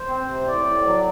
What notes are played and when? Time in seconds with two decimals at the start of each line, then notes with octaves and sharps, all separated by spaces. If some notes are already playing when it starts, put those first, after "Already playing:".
Already playing: C5
0.08 C4
0.27 C3
0.47 A2 D5
0.66 A2
0.86 F#3